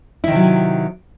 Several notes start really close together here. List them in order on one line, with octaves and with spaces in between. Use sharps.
E4 D#3 C3 F#3